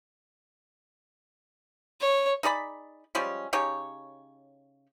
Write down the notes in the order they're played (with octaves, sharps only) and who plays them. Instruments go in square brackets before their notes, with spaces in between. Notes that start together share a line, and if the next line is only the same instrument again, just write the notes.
[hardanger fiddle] C#5
[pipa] D#4 G#4 D5 B5
F3 G3 G#3 C#4
C#3 D#4 G4 C#5